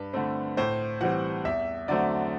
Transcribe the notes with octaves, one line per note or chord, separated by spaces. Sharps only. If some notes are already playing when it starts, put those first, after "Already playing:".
Already playing: G2 B4
D3 A3 C4
A2 C5
E3 G3 C4 F#5
E2 E5
D3 F#3 A3 C4 D5